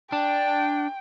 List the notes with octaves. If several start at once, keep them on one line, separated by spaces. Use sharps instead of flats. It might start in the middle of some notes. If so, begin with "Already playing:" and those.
D4 G5